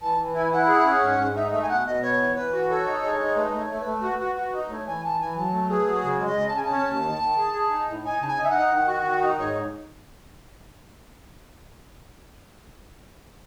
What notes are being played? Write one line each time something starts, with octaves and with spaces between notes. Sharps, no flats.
E3 A5
E3
E4 G#5
E4 F#5
G#4
C#4
G#2
G#2
D#4 E5
A3 E5
G#5
B2 F#5
B2 D#5
B3 C#5
E3
E3 B4
F#4
A4 C#5
D#4
G#3 C#5
D#4
A3 B4
A3
C#5
A3
B4
A3
F#4 B4
F#4
F#4
D#4
A3 C#5
E3 G#5
E3 A5
E3 G#5
F#3 A5
A3
G#4 B4
F#3
C#3 C#5
G#3
D#5
C#3
A5
C#3 G#5
A5
C#4
D#2
D#3
D#3
G#4
G#4
D#4
A2
D#4 G#5
C#3 A5
G#5
D#4
E5
D#4 F#5
D#3
F#4
D#3
D#4
G#2 C#5